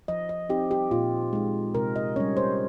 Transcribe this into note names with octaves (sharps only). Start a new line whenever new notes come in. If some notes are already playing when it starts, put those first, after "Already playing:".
F3 D#5
D#5
C4 D#4 G4
G4
A#2 F4
G#3 D#4
C3 A#4
D#5
G3 C#4 C#5
C5